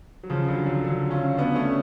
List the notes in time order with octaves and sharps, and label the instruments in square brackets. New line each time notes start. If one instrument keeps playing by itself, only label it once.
[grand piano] F#3
C#3 F3
D3 F#3
D3 F#3
D3 F#3
C#4 F4
B3 D4
A3 C#4